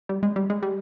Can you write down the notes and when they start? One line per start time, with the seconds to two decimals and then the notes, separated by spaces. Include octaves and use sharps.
0.09 G3
0.23 G#3
0.36 G3
0.50 G#3
0.62 G3